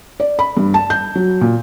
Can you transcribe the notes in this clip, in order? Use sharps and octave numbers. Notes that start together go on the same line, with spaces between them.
D5
B5
G2
A5
G6
F#3
A#2